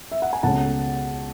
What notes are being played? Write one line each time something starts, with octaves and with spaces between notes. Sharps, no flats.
E5
F#5
G#5
C#2 B2 A3 C#4 F#5 A5